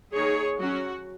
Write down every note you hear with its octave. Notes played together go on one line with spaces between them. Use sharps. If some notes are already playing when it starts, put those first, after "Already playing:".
D#3 A#3 D#4 G#4 C#5
F#3 C#4 F#4